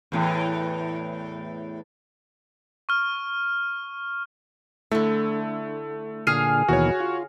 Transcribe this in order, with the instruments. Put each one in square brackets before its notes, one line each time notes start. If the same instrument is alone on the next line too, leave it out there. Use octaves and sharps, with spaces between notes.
[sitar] E2 A2 E3
[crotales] C#6 F6
[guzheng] D3 E4 [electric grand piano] A3
[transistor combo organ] A#2 D3 [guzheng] G#4 [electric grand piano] F6 C7 D#7
[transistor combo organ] D#2 B2 E3 [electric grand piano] F#4 C#5
[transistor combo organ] F4